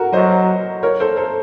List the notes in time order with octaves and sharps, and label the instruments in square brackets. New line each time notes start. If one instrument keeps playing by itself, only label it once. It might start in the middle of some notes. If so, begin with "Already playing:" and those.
Already playing: [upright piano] F#4 A4 A#4
[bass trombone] F#3 [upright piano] C5 D#5
[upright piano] A#4 C#5
A4 C5
A4 C5